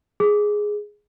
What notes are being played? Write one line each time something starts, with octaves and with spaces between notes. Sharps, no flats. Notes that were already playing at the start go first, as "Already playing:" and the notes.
G#4